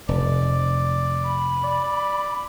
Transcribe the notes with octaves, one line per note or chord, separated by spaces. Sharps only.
F1 D5
B5
D5